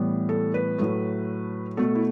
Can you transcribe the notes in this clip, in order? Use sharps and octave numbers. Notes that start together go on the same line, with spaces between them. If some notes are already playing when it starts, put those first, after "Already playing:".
Already playing: A2 E3 G3 B3
A4
B4
A2 F#3 A3
B2 A3 A4
E4